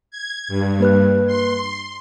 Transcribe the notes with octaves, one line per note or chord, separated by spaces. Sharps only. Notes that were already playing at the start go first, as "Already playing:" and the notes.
G#6
G2
A#3 B4 F#6
C6